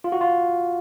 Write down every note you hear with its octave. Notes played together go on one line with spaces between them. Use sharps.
F4
F#4
F4